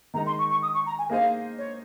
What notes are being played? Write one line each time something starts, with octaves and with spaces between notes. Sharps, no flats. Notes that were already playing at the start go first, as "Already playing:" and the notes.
D#3 G#3 D#4 A#5
C6
C#6
C#6
D#6
C#6
A#5
G#5
A#3 D#4 G#4 C5 D#5 F5
C#5